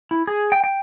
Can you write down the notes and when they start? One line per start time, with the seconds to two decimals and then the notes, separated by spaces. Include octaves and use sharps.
0.11 E4
0.27 G#4
0.52 G5
0.64 G5